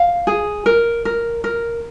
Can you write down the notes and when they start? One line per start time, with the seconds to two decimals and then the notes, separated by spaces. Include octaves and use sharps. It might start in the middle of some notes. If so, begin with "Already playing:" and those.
Already playing: F5
0.27 G#4
0.66 A#4
1.05 A#4
1.44 A#4